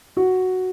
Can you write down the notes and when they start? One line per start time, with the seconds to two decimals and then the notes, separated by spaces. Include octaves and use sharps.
0.17 F#4